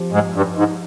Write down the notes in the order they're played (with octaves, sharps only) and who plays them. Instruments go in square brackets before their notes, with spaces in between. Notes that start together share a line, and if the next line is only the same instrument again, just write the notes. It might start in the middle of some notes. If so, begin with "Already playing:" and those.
Already playing: [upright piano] F3 C4 G4
[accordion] G#2
G2
G#2